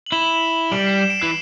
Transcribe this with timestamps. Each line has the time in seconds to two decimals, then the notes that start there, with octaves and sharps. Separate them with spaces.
0.06 F#7
0.12 E4 E7 G7
0.72 G3 D7 F#7
0.86 C7 E7
1.01 E7
1.10 D7
1.20 E3 C7